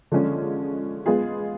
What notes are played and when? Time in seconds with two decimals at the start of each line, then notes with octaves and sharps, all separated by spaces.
0.12 D3 F3 G#3 C#4
1.06 G#3 B3 F4 G#4